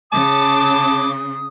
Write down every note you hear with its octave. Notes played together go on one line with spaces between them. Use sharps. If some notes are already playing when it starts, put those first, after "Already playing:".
C#3 A5 D6 D#6